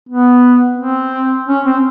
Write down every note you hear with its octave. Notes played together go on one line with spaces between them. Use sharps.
B3
C4
C#4
C4